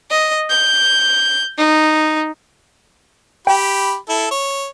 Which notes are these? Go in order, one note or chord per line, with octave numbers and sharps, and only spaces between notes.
D#5
G6
D#4
G4 G5 B5
E4 A4
C#5